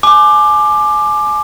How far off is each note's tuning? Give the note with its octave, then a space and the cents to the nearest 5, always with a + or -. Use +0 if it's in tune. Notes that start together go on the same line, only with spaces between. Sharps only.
G#5 +35 D6 +15